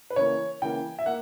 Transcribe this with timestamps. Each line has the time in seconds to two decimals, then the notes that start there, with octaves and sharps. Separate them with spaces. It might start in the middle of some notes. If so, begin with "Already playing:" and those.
0.10 B4
0.16 C#3 E3 A#3 C#5
0.62 C#3 E3 A#3 G5
0.99 E5
1.06 A#3 F#5